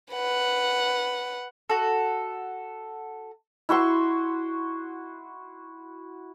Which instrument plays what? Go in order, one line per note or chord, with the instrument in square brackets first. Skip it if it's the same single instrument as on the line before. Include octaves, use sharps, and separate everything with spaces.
[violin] B4 F#5
[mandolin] F#4 A4
[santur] E4 F#4 C6 C#6